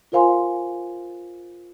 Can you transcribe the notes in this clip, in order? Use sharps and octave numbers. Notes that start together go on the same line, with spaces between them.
F4 A#4 C5 F5 G#5 C6